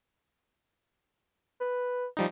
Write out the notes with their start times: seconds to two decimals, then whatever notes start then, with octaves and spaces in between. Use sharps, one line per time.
1.61 B4
2.17 F3 G3 D#4